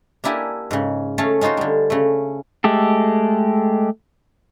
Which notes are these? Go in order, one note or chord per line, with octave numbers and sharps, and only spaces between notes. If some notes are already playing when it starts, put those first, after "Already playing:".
A#3 D4 E4 G4 G#5
G#2 C#3
A3 C#4 A4 C#5 F5 A5
C#4 D#4 F4 F#4 C5
D3 G3
C#3 A3
G#3 A3 G4 A4